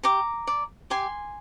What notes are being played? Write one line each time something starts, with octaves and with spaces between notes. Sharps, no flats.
G4 A#5 D6
D5
G4 G#5 C6